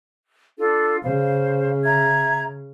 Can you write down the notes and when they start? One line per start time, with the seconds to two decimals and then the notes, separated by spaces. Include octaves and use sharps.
0.58 D4 F4 A4
1.03 C#3 C5 F5
1.84 E5 A#5 G#6